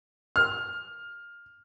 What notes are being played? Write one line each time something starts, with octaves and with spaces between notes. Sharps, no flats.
F6